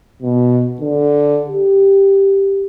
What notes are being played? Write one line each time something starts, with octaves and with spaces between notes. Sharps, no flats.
B2
D3
G4